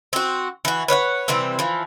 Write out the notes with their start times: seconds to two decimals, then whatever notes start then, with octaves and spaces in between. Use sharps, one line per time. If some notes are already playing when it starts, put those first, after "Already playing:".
0.13 C4 F#4
0.65 E3 F#4
0.88 B4 C#5 F5 F#5
1.28 C3 E3 G3 C4
1.59 E3 F3